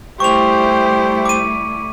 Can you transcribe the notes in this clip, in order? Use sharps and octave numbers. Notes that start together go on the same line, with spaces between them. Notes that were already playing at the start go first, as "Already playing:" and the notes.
G3 A3 E4 G4 C5 C#6 F7
D6 D#7